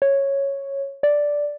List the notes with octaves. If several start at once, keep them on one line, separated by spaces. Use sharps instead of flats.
C#5
D5